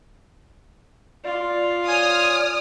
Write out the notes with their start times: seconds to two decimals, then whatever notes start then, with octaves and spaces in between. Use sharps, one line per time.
1.24 F4 D5
1.88 C#5 G#5 D#6 F6